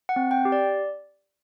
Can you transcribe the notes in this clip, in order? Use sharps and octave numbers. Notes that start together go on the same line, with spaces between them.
F#5
C4
G5
G4
D5